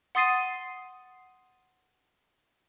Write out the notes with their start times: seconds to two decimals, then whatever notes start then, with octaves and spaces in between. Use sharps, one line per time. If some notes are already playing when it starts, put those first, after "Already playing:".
0.15 F#5 C6 D#6 A6 C7 D#7